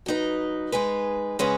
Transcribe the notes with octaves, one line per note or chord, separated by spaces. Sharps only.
F#3 D#4 B4
G#3 D#4 G#4 B4
C#3 G#3 C#4 G#4 B4